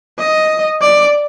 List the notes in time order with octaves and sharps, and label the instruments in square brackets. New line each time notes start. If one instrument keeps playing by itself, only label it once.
[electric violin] D#5
D5